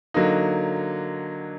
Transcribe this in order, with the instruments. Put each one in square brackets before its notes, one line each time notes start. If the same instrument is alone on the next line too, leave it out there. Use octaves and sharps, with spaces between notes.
[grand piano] D3 F#3 A#3 D#4